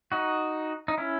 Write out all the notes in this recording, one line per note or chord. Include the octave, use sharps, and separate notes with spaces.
D#4 F#4
D#4
C#4 E4